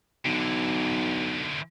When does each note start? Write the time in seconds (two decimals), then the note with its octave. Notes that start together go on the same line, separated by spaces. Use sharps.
0.25 B1 D3 E3